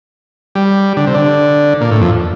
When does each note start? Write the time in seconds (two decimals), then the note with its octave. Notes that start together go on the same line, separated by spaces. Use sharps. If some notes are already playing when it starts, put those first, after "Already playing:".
0.55 G3
0.97 D3
1.07 C3
1.14 D3
1.81 A#2
1.91 A2
2.01 F2